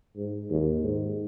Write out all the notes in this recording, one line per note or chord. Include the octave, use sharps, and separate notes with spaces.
G#2
D#2
G#2